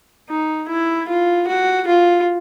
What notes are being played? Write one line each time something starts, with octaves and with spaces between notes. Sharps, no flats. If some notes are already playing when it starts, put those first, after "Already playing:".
D#4
E4
F4
F#4
F4